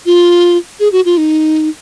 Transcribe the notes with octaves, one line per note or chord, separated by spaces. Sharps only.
F4
G#4
F#4
F4
D#4